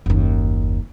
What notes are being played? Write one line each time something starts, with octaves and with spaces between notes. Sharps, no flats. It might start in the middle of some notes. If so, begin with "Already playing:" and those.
F#1 D#2